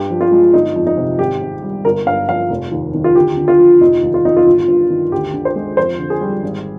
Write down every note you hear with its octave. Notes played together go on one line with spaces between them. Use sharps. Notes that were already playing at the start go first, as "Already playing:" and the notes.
Already playing: G2 G4
F3
F4
G#3
G1 D#4
F2
D#4
C3
G#1 G4
G#2
G3
G1 A#4
G2 F5
F3 F5
F1
D#2
D#3
F4
D2 G4
D3
F4
F3
F1 D#4
D#2
F4
D#3 D#4
F4
G1
G2
D#3
D2 G4
D3
C5
G#3
F2 C5
D3
G#4
G3
G#1